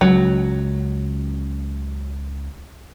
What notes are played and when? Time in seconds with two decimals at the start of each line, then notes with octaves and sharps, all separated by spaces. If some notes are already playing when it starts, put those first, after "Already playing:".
0.01 C#2 C#3 F#3